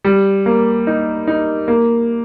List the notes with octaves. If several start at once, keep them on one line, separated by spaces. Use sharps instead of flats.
G3
A#3
D#4
D#4
A#3